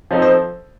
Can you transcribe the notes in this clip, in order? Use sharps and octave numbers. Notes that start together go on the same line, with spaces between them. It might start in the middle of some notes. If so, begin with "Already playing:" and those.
F3 C4 D#4 A4
C5